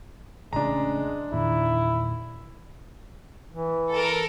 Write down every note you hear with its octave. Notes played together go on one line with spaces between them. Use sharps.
A1 C#3 G#3 C#4 D4 A#5
E2 A#2 D#3 E4
E3
A4 A#4